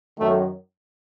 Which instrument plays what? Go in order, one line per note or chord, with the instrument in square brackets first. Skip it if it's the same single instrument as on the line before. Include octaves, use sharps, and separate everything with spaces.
[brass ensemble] F#2 D#3 F#3 A3